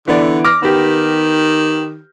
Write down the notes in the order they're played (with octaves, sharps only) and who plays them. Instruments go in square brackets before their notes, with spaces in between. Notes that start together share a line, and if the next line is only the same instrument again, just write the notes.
[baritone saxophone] D3 [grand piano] E3 B3 D5
[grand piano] D6 F6 A#6
[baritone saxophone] D#3 [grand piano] B3 G4